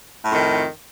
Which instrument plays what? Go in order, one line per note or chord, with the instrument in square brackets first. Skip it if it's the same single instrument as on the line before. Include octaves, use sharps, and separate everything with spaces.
[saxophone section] A2
F2
D#3